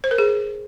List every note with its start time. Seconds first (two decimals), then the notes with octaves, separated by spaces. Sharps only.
0.04 C5
0.11 A#4
0.18 G#4